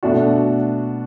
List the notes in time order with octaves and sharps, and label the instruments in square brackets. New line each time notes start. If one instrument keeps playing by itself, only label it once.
[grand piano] B2 A3 D4 F#4